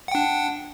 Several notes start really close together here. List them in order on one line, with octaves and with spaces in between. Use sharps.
F#5 G5 D4